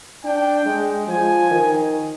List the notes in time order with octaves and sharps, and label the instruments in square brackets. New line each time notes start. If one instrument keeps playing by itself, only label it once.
[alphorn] D4 [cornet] G5
[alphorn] G#3
[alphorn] F3 [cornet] G#5
[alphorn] D#3